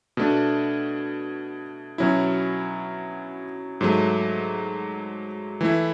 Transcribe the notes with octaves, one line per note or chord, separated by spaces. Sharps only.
B2 A3 D4
B2 F#3 C#4 E4
G#2 F#3 A3
E3 A3 E4